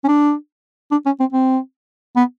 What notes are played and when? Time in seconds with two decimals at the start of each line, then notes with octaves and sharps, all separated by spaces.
0.04 C#4
0.08 D4
0.91 D4
1.06 C#4
1.20 C4
1.33 C4
2.16 B3